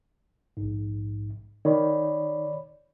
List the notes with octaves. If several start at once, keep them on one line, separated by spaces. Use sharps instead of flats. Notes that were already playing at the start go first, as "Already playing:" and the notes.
A#1 G#2
D#3 C#5 D5 B5